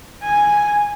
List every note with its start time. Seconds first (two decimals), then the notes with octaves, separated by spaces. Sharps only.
0.24 G#5